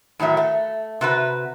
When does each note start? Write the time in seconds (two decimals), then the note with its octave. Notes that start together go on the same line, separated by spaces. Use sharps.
0.19 A2 D#3 F#3 E5
0.37 A3
1.01 C3 F#4 B4